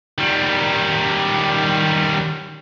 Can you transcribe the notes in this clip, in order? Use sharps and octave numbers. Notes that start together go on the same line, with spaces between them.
D#3 G3